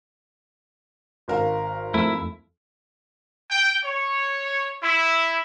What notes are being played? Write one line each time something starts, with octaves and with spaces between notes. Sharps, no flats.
G#1 A#4 F5
F2 A3 E4
G5
C#5
E4